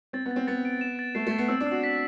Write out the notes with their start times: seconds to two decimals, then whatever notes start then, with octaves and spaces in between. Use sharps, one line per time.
0.13 C4 A6
0.25 B3
0.31 A6
0.36 C4
0.47 B3 A6
0.65 D7
0.81 E7
0.99 A6
1.15 A3 C7
1.27 A3
1.32 A6
1.38 B3
1.48 C4 E6
1.60 D4
1.67 F#4 E6
1.84 B6